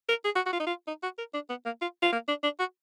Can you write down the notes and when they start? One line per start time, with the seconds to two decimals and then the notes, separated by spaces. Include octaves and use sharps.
0.09 A#4
0.25 G#4
0.35 F#4
0.46 F#4
0.53 F4
0.60 D#4
0.67 F4
0.87 D#4
1.03 F#4
1.18 A#4
1.34 D4
1.49 B3
1.66 A#3
1.81 F4
2.03 F4
2.12 A#3
2.28 D4
2.43 D4
2.59 F#4